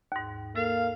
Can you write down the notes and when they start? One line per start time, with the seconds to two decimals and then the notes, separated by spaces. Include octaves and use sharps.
0.12 D#2 G#2
0.56 A#3 A4 F5